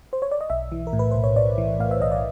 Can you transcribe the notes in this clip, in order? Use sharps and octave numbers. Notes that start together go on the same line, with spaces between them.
C5
C#5
D5
D#5
B1 E5
E3
A#4
A2
B4
B1 C5
C#5
B1 D5
E3
A2 F5
E5
B1 D#5
D5